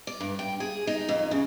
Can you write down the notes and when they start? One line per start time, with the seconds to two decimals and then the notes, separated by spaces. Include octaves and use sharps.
0.07 D5
0.20 G2
0.39 G5
0.60 G#4
0.87 D#4
1.09 F2
1.31 C#3